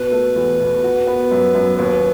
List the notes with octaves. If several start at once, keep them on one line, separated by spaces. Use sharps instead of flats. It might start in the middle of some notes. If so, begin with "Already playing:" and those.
Already playing: B2 B4
A3
E2
B2
F#4
B3
F#2
F#2
D#2 B4